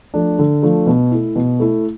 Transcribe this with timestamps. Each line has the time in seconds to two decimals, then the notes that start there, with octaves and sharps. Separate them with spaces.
0.14 F3 A3 D4
0.39 D3
0.63 F3 A3 D4
0.87 B2
1.11 A3 E4
1.36 B2
1.60 A3 E4